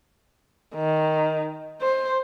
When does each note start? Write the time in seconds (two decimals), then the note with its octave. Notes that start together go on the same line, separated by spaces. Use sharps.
0.75 D#3
1.82 C5